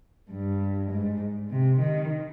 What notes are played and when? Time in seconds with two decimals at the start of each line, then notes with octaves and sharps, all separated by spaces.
0.31 G2
0.91 G#2
1.50 C3
1.80 D#3